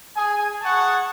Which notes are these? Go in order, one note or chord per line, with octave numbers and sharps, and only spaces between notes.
G#4 G#5
G#4 F#5 A5 C#6